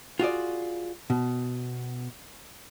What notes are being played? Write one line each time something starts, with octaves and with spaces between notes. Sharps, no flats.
F4 F#4 G#4 D5
B2